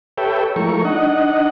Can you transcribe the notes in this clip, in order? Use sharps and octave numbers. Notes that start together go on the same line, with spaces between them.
G4 A4 B4 C#5 E5 G5
F3 G#3 A3 E4 A#4 C#6
D4 D#4 D#5 F#5